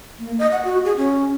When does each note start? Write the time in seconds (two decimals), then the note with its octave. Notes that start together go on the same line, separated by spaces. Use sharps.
0.19 A#3
0.39 D#5
0.52 F#5
0.65 F#4
0.85 G#4
0.97 C#4